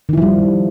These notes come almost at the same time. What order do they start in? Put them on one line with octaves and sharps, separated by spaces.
D#3 E4 F3 G3